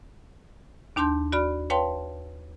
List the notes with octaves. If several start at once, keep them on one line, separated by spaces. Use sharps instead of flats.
D#2 D4 A5 C6 G6
F#4 D5 B5 F6
B4 C#5 F5 G5 A5 C6